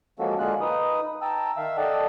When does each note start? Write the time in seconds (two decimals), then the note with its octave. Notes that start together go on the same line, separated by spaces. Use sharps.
0.19 F3 G#3 A#3 C#4 F#4 A4
0.39 D3 G#3 A#3 F4 G#4 F#6
0.61 D#4 B4 D#6
1.22 G5 A5 A#5 E6
1.57 D#3 E5 F5 E6
1.77 A4 D5 D#5 F#5 G5 A5